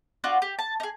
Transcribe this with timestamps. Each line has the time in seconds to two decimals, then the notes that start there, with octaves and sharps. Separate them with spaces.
0.24 D4 F4 F#4
0.42 G4
0.59 A5
0.80 D#4 G#4